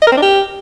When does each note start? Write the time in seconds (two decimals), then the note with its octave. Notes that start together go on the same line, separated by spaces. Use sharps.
0.02 D#5
0.07 A#4
0.12 C4
0.17 D4
0.22 G4